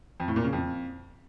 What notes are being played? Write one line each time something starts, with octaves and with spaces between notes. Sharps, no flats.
F2
A2
A#2
C#3
F2